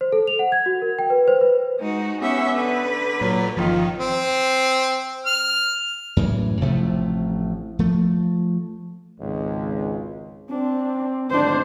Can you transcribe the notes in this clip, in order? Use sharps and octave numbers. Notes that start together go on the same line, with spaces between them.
C5
A4
F7
F#5
G#6
F#4
A#4
G5
B4
C5
B4
G#3 D#4 F#4
B3 C#4 G4 C#5 E5
D3 B4
A#2 F#3
G1 D#3 F3 F4
C4
F6
F#2 A2 E3
A1 C3 F3 A3
F3 A3
G#1 C#2
C4 D4
G#1 D2 B2 D4 C5